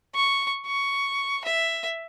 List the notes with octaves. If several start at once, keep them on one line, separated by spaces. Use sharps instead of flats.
C#6
C#6
E5